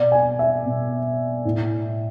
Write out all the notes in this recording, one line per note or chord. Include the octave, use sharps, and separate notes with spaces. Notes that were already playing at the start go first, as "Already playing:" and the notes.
Already playing: B2 D5
G#5
E5
B2
A2